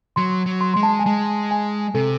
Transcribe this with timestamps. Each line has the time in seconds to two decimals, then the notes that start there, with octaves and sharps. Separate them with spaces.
0.16 F#3 C6
0.46 F#3
0.61 C6
0.74 G#3 C6
0.83 A5
0.99 G#5
1.06 G#3 A5
1.51 G#5
1.94 C3 A4